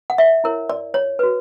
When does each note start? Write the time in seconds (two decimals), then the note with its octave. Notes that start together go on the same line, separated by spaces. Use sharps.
0.10 F#5
0.18 E5
0.44 E4 A#4 C#5
0.70 D5
0.94 C#5
1.19 F#4 B4